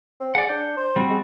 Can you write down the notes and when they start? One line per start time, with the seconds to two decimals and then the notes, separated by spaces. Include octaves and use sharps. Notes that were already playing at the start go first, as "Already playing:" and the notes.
0.20 C4
0.35 G#4 D5 F#5
0.49 D4 G6
0.77 C5
0.96 G3 C4 F#4
1.10 G#3